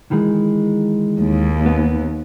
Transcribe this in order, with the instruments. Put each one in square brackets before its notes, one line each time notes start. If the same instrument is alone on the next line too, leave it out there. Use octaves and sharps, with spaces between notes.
[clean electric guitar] D#3 E3 G#3
[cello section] D#2
[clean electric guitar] B3